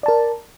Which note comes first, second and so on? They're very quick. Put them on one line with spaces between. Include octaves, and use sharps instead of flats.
D5 A5 A#4